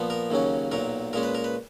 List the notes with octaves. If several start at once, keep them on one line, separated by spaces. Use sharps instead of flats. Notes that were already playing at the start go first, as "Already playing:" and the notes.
Already playing: A#2 F3 B3
A#4
D#2 C#3 F#3 C#4
B1 A#2 F#3 A#4
A#2 G#3 C#4 A#4
B4
A#4
B4